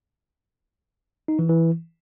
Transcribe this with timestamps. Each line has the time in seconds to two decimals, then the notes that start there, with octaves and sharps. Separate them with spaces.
1.28 D#4
1.39 E3
1.49 E3